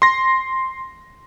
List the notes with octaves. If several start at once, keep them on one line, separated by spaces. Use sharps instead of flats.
C6 A#6